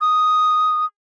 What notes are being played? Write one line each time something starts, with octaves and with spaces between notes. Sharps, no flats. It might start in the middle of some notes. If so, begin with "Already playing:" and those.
D#6